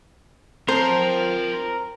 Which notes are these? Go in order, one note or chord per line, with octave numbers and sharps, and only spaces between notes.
C4 F4 A#4 C5 A5